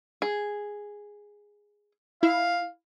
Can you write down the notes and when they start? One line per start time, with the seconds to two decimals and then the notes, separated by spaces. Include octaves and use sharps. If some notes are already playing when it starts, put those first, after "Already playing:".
0.22 G#4
2.23 E4 F5